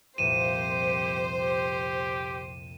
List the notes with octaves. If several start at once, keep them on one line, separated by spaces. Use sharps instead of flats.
C2 F2 A#2 G4 C5 D#7 E7
G4